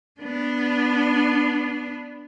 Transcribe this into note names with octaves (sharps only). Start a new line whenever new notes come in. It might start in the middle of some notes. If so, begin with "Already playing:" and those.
B3 D4